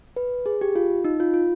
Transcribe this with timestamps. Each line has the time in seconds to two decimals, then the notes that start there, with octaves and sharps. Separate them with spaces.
0.16 B4
0.46 G#4
0.61 G4
0.76 F4
1.05 D#4
1.20 F4
1.34 F4